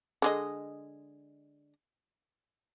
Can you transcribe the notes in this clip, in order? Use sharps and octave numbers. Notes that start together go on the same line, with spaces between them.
D3 G#3 D#5